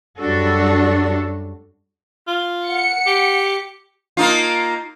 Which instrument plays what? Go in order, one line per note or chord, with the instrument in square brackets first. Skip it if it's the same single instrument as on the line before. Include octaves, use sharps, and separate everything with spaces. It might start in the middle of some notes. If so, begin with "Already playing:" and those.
[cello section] F#2 G3 D4 F#4 A4
[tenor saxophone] F4
[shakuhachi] F#5 [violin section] C#7
[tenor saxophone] G4
[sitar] A#3 D#4 F4